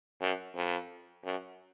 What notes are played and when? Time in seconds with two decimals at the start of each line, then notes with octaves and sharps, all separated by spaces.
0.21 F#2
0.55 F2
1.24 F#2